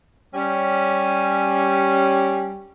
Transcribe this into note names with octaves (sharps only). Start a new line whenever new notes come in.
G3 C#4